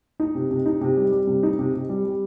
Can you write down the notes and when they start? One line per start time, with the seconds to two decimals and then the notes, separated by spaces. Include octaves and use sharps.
0.20 D#4
0.35 C3
0.51 C3
0.66 D#4
0.81 C3
0.97 G3
1.12 G3
1.27 C3
1.43 D#4
1.59 C3
1.73 C3
1.89 G3
2.05 G3